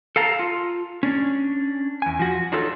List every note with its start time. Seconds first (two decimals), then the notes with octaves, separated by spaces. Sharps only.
0.16 A4 F5 A5 A#5
0.39 F4
1.03 C#4 D4
2.02 E2 G#5
2.19 F3 F#4
2.52 D4 D#4 F4 A4 B4 C#5